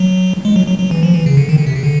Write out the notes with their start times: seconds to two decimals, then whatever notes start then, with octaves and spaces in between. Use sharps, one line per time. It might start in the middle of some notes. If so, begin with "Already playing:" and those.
Already playing: F#3
0.45 G#3
0.56 F#3
0.68 F#3
0.79 F#3
0.91 E3
1.03 F3
1.14 E3
1.26 C#3
1.37 D3
1.49 D#3
1.58 D3
1.67 C3
1.76 C#3
1.84 D3